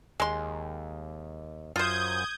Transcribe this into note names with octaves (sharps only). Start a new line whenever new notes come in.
D#2 G#3 C6
F#2 F4 C5 D#6 G6 G#6